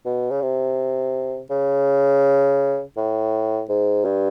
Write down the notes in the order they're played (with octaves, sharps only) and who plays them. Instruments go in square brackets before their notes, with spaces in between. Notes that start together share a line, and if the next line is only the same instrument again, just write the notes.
[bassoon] B2
C#3
C3
C#3
A2
G#2
G2